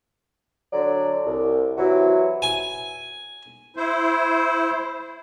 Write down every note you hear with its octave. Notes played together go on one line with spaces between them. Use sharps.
D3 F#3 D5
C2
C3 E3 F#3 E4 F#4
G#5
E4 C5